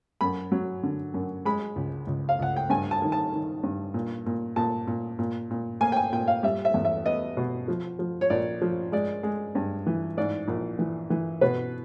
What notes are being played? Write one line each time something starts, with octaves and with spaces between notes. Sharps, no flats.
F#2 B5
F#3
D3
F#2
G#3 B5
C#2
C#2
F5
C#2 F#5
G5
G2 G#5
A5
D#3
A5
D#3
G2
A#2
A#2
A#2 A5
A#2
A#2
A#2
A#3 G#5
G5
G#5
A#2 G5
F5
G3 E5
E5
E2
E5
B3 D#5
B2
F3
F3
C#5
A#1 D5
F3
G#3 D5
G#3
G2
E3
G#2 D5
A#1
E3
E3
B2 B4